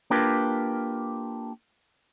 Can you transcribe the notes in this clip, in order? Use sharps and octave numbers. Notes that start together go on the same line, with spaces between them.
A#3 D4 F4 G4 A#4 B4